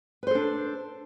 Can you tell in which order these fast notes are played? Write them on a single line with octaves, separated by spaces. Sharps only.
B4 C5 A4 D4